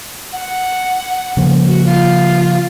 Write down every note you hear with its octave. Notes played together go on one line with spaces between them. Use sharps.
F#5
C#3 F3 A#3
F#4
F4